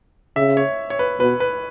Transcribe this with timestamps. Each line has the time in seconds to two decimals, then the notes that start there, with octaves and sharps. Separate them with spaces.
0.36 C#3 E5
0.57 C#5
0.90 C#5
0.99 B4
1.19 B2 B4
1.40 B4